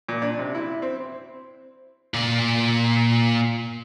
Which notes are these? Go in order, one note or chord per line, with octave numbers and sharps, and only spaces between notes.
A#2
D4
C3
E4
C4
A#2 D5